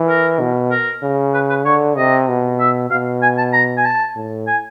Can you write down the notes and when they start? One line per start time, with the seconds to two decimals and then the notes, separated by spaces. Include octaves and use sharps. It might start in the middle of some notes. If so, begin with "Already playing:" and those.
Already playing: E3
0.08 A#4
0.40 B2
0.71 A#4
1.03 C#3
1.34 B4
1.49 B4
1.65 D3 C#5
1.97 C3 D#5
2.28 B2
2.60 E5
2.90 B2 F5
3.23 G#5
3.38 A5
3.53 A#5
3.77 G#5
3.85 A5
4.16 A2
4.47 G#5